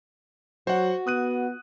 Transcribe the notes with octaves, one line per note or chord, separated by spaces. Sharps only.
F#3 F#4 C5 F#5
B3 D#6 F#6 D#7